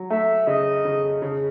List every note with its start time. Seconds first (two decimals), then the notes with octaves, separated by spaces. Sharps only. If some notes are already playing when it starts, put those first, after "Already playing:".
Already playing: F#3
0.10 A3 E5
0.47 C#3 D#5
0.85 C#3
1.22 C#3